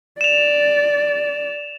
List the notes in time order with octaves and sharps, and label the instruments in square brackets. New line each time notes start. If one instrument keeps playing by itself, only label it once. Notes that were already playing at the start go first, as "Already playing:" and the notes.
[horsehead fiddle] D5 [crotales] E7 F7